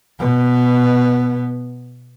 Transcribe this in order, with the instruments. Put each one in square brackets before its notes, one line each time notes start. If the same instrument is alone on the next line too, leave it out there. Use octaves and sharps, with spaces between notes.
[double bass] B2 B3